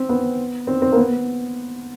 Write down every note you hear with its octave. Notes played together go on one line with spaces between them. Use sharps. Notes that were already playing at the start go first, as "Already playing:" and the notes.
Already playing: C4
B3
C4
C4
A#3
B3